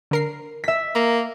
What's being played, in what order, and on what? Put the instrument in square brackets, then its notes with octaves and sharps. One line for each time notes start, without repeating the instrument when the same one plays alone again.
[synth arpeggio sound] D3 A#4 C7
[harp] E5 B6
[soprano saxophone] A#3 [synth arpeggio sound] A#5